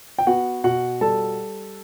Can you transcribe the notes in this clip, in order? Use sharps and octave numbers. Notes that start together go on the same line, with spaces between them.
G5
B3 F#4 F#5
B2 F#4 F#5
G3 A4 A5